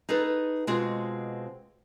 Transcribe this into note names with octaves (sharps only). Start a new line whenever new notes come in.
D#4 G#4 A4 B4
B2 G#3 C4 F4 F#4 G#4